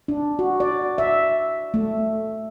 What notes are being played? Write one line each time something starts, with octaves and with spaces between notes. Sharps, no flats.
D4
F#4
D5
E5
A3